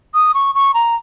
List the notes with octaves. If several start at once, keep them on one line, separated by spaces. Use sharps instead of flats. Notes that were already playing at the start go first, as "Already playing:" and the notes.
D#6
C#6
C#6
A#5